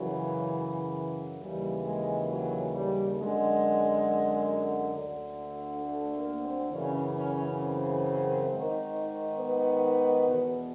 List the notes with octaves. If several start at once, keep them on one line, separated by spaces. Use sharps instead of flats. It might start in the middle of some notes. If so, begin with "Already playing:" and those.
Already playing: F#2 C#3 E3 F#3
D#2 C#3 E3 G3
G#3
F#3
G3
F#2 D3 G#3
D2 D3
A3
A#3
C4
F#2 C#3 E3 C#4
C#4
C4
G#2 D#3
B3
E2 B2